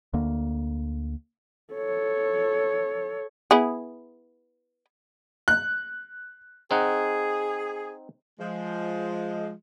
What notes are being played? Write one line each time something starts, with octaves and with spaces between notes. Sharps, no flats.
D2 D3 A#3
A4 C#5
B3 E4 G#4
F#6
C4 D#4 G#4 F#5
F3 G#3